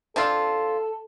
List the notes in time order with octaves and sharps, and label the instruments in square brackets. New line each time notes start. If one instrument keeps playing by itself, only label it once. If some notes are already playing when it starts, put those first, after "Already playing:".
[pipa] C4 D4 F4 [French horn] A4